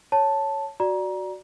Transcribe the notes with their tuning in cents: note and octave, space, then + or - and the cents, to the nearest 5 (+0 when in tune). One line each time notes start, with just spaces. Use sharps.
C#5 +0 A5 +0
F#4 +0 D5 +0 A#5 +20